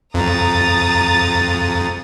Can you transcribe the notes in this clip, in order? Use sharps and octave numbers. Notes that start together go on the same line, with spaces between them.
F2 A#5 D#6 A6